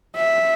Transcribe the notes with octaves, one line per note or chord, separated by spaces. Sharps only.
E5